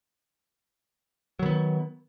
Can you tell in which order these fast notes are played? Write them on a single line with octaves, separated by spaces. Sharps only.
F#3 D#3 B3